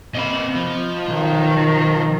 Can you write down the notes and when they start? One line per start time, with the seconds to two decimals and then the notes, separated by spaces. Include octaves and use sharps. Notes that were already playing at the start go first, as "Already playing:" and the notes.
0.15 C3 A#3 D#5 B5
0.55 F3
1.08 B1 D#3